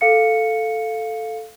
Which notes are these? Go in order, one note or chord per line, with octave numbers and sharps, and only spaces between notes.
A4 F5 C#7